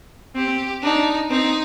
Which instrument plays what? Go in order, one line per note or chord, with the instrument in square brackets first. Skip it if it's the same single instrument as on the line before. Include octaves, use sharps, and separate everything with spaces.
[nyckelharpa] C4 [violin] G4
[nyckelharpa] D4 [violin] D#4
[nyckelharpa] C4 [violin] D#4